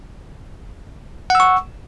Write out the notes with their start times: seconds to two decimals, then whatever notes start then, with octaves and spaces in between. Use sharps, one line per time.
1.30 F#5
1.35 E6
1.40 C#6